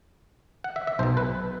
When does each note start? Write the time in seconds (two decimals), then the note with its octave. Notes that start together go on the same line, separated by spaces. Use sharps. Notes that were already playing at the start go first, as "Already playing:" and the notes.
0.64 F#5
0.76 E5
0.87 E5
0.99 B1 C5
1.03 B2
1.17 B4